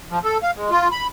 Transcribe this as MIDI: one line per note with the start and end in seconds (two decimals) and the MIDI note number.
0.10 0.19 53
0.24 0.38 69
0.43 0.51 77
0.56 0.70 56
0.71 0.88 65
0.92 1.07 83